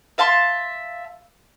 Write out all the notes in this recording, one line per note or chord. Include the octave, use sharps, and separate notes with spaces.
E5 F5 A5 C6